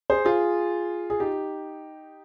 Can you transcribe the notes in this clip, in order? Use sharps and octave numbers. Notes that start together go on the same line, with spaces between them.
G#4 C5
F4 G#4
G#4
D#4 G4